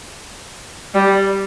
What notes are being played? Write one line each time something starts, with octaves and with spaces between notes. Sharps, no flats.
G3